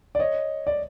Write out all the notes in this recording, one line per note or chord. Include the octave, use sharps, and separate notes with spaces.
D5
C#5 D#5
D5